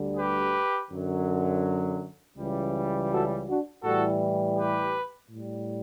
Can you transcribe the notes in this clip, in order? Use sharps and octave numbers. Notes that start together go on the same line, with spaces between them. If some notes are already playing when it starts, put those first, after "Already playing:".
Already playing: D2 D3 G3
G4 B4
F#2 D3 F#3
C#2 C#3 E3 G3
F#4 A4
D4 F#4
A2 E3 G3 F#4 A4
G4 B4
A2 G3